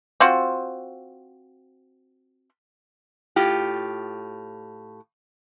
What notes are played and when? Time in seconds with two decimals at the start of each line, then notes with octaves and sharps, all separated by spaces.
0.20 C4 F4 F#4
3.36 A2 F4 G4